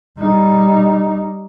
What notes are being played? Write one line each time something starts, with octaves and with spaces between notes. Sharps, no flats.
G3 D#4